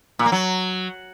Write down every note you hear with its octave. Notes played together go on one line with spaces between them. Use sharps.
A#2
A#3
F#3